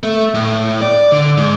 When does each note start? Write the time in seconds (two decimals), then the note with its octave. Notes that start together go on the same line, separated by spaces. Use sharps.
0.03 A3
0.34 A2
0.81 D5
1.12 D3
1.37 G#2